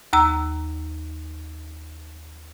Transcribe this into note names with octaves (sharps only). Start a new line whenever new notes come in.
D#2 A#5 E6